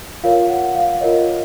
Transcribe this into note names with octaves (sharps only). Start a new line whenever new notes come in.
F4 A#4 C#5 F5
F#5
F5
F4 A#4 C#5 D#5